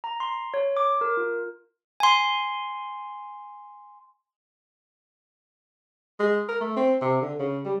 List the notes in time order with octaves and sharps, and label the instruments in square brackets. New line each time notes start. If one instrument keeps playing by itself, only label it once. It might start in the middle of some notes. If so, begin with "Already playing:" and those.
[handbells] A#5
C6
C#5
D6
A#4
F4
G#5 C6
[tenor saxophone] G#3
A#4
A3
C4
C3
D3
C#3
G3